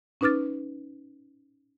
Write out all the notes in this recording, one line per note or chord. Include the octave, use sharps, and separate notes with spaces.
C#4 D#4 B4 D6 F6 A6